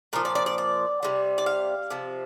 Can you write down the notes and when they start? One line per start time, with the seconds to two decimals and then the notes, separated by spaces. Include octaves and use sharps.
0.13 A#2 F3 A#4
0.25 D5
0.35 D5
0.46 D5
0.58 D5
1.03 C3 G3
1.38 D5
1.46 F5
1.90 C3 F3